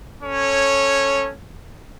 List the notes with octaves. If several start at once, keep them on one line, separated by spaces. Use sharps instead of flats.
C#4 A4 C#5